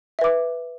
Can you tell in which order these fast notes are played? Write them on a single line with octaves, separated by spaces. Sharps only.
E5 B4 D6